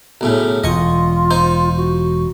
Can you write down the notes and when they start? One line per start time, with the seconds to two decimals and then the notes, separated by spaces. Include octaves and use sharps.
0.21 B1 A2 C#3
0.64 E1 F4 D#5 C#6
1.31 D#4 C5
1.75 F#4